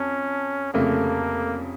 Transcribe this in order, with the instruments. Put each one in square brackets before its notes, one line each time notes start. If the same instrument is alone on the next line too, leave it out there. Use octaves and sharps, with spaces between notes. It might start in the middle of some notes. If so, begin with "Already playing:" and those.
Already playing: [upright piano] F2 [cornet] C#4
[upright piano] F1 F2 C#3 A3 [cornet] A#3